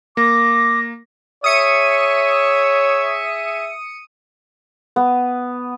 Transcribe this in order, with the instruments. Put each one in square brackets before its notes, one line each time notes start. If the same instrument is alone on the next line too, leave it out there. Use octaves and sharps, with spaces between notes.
[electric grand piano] A#3 [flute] D6 [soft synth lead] A#6
[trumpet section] G#4 E5 [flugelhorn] C#5 [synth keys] D#6 C#7 D#7
[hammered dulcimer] B3